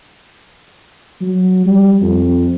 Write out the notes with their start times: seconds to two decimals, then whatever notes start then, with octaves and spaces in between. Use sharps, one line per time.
1.21 F#3
1.66 G3
2.02 F2